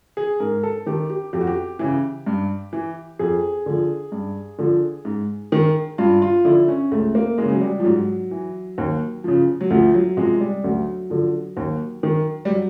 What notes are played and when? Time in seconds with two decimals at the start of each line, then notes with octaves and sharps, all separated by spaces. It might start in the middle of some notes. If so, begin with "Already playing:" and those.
0.17 G#4
0.40 G#2 A#4
0.63 A4
0.86 D#3 G4
1.10 G4
1.33 F2 G4
1.41 F#4
1.47 G4
1.79 C#3 E3
2.26 G2
2.73 E3
3.19 F2 G#4
3.66 D3 F3
4.12 G2
4.58 D3 F3
5.05 G#2
5.52 D#3
5.98 G2 F4
6.22 F4
6.45 D3 F3 E4
6.68 C#4
6.91 C#2 A3
7.15 A#3
7.38 C#3 E3 G#3
7.51 F#3
7.61 G3
7.80 F3
7.85 G#2 F#3
8.31 E3
8.78 D#2
9.24 C#3 F3
9.61 F#3
9.70 D2 F3
9.94 F#3
10.17 C3 F3 G#3
10.41 G3
10.64 D2 F#3
11.10 D3 F3
11.57 D#2
12.03 D#3
12.45 G3
12.50 F#3